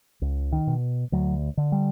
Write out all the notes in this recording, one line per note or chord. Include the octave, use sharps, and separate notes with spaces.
C#2
D#3
B2
D2 F#3
D3
G3